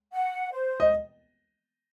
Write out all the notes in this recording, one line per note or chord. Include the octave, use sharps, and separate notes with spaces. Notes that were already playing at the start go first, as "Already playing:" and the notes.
F#5
C5
D#5